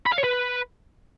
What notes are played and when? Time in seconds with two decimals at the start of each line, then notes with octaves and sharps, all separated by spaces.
0.06 B5
0.12 F5
0.18 C#5
0.24 B4